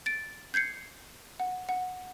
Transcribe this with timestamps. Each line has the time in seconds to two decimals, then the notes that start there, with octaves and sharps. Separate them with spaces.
0.06 A6 D7
0.54 G6 G#6 C7 C#7
1.40 F#5
1.69 F#5